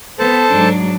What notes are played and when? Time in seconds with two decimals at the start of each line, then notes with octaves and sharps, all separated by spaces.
0.19 B3 A4 C5 A5
0.51 G#2 F#3 D4